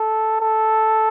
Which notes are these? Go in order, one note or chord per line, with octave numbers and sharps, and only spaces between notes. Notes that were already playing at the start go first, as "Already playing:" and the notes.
Already playing: A4
A4